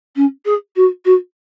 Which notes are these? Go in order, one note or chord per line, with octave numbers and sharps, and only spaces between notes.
C#4
G#4
F#4
F#4